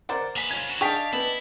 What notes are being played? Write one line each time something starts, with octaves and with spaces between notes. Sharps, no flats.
A#4 C5 D5 F#5
A#3 G#4 B4 B5
C#4 F4 G#6
D3 F#4
D4 G#4 D#5 F5 G5 C#6 B6
B3 E4